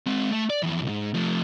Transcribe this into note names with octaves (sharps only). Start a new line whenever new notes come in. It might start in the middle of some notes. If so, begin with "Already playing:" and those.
G#3 C4
A3
D5
F2 E3
C2 G#2
F3 A3